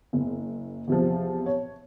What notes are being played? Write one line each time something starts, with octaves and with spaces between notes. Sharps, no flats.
F#1
E2 C3 F3
C#5